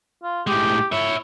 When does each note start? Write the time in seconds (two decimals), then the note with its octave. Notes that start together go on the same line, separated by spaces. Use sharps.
0.23 F4
0.47 A2 G#3 G4
0.92 E4 C#5 E5